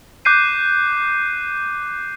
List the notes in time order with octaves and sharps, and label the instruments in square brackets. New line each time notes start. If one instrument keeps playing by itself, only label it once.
[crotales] D6 F#6 G6 C7 D#7